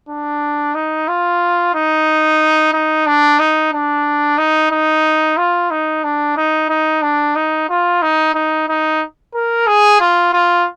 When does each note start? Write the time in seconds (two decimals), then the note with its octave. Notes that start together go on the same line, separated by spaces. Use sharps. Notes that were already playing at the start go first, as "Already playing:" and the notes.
0.09 D4
0.75 D#4
1.08 F4
1.75 D#4
2.73 D#4
3.06 D4
3.39 D#4
3.73 D4
4.38 D#4
4.71 D#4
5.37 F4
5.71 D#4
6.04 D4
6.37 D#4
6.69 D#4
7.02 D4
7.36 D#4
7.69 F4
8.02 D#4
8.34 D#4
8.68 D#4
9.34 A#4
9.67 G#4
10.00 F4
10.33 F4